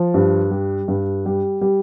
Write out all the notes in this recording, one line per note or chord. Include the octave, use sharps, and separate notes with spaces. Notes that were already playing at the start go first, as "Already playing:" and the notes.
Already playing: F3
G2
G3
G2
G3
G3